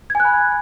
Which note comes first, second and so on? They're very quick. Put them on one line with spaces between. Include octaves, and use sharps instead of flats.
G#6 G#5 F#6 B5